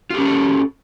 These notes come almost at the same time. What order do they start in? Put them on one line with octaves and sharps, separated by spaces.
F4 G4 C#4 A#4 A4